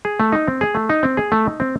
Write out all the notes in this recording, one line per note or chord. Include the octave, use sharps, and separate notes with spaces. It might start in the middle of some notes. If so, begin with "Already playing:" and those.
G#4
A3
D#4
C4
G#4
A3
D#4
C4
G#4
A3
D#4
C4